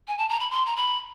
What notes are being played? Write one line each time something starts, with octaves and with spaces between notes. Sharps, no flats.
G#5
A5
A#5
B5
C6
A#5
B5